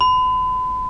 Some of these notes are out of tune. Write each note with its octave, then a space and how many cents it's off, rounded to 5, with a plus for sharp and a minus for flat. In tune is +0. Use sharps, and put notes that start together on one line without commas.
B5 +40